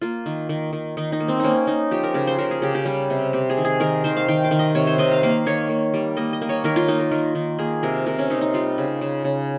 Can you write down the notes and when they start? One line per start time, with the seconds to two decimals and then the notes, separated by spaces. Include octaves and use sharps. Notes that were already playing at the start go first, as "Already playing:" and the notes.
0.01 A#3 F4
0.26 D#3
0.49 D#3
0.73 D#3
0.97 D#3 D#4
1.12 D#4
1.20 A#3
1.28 C4
1.40 A#3 C#4 D#4
1.67 A#3 D#4
1.91 F3 G4
2.03 A#4
2.14 C#3 A#4
2.27 C5
2.38 C#3 A#4
2.51 G#4
2.62 C#3 G4
2.75 G4
2.85 G3 G4
3.10 C3
3.33 C3 G4
3.50 G#4
3.58 D#3
3.65 G#4
3.80 D#3 A#4
4.04 D#3 C5
4.17 F5
4.28 D#3 G5
4.44 F5
4.51 D#3
4.59 D#5
4.75 C3 C#5
4.87 C5
4.98 D#3 D#5
5.11 F5
5.23 A#3 F5
5.46 D#3 C#5
5.69 A#3
5.94 G3
6.17 A#3 D#5
6.33 D#5
6.41 A#3
6.49 C#5
6.64 D#3 A#4
6.76 F4
6.88 A#3 D#4
7.00 A#4
7.11 D#3 A#4
7.35 D#3
7.59 A#3 G#4
7.83 C3 A#4
8.06 C3 A#4
8.19 C#4
8.30 C3 D#4
8.41 D#4
8.54 G3 F4
8.78 C#3
9.01 C#3
9.24 C#3